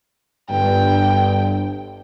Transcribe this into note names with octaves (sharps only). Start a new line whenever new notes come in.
G1 G2 G5